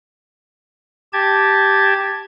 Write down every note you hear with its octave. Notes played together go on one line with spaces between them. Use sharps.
G4 A5 G#6